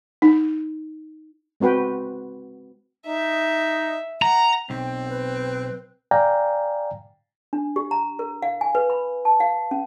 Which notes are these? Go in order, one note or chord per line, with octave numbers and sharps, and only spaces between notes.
D#4
G#3 C4 F#4 B4 G5
D#4 E5
F#5 A#5
B1 C4 G5
B4
D5 F5 G5 G#5 A#5
D4
G4
A#5
A#4
F5
G#5
B4
B5
A5
F5
C#4